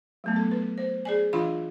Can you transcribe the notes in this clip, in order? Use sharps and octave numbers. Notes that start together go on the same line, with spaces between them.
F#3 A3 B3
A4
B4
C5
G#4 D5 G#5
E3 D4 F4 F5 B5 C6